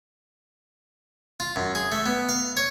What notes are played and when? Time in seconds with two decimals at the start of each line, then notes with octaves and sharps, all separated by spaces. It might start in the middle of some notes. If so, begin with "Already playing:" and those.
1.40 F4
1.56 F#2
1.75 G#4
1.92 A3
2.06 B3
2.29 F5
2.57 C#5